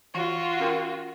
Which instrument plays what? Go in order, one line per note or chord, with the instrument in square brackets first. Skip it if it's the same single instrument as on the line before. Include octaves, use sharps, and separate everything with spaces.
[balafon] E3 [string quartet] F4 F#4
[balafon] C#4 A#4 G5